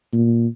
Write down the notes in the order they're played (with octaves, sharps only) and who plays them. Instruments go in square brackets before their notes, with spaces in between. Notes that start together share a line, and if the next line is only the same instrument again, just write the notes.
[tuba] A#2